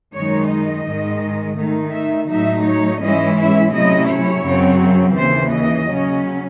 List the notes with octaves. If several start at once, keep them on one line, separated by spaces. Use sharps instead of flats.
F#2 D#3 G#3 D#4 C#5
D#5
G#2 D#3 G#3
D#3 A3 D#4
E5
A2 F#3 A3 D#4 E5
C#5
G#2 E3 G#3 C#4 E4 D#5
E5
C3 F#3 A3 C#4 E4 D#5
C#5
F#2 C#3 F#3 C4
D#2 C#3 E3 C5
D#5
C#3 F#3 C#4